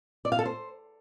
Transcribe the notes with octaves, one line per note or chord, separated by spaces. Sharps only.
D5
F5
A4
C5